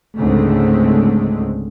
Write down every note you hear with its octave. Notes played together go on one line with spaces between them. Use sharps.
C#2 G#2 D3 G#3 A3 C4